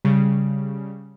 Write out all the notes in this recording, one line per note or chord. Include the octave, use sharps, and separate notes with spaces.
C#3 G3